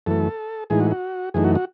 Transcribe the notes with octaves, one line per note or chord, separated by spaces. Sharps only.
F#2 E3 A3 A4
A2 E3 G#3 D#4 G#4
F#4
F#4
F#2 E3 A3 D#4 G#4
F#4
F#4